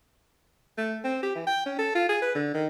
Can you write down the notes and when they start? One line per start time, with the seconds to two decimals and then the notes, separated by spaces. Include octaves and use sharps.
0.78 A3
1.04 C4
1.23 G4
1.35 E3
1.47 G5
1.66 C#4
1.79 A4
1.95 F4
2.09 G#4
2.22 B4
2.35 D3
2.54 D#3